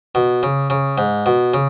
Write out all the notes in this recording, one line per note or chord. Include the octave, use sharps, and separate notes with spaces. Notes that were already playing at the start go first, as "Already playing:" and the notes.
B2
C#3
C#3
G#2
B2
C#3